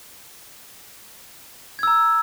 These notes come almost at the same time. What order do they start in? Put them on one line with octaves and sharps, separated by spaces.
G#6 E6 A#5